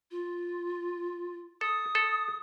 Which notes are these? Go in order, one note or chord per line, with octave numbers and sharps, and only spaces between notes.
F4
A4 D#6
A4